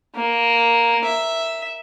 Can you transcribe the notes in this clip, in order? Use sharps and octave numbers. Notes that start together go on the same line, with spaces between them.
A#3
E5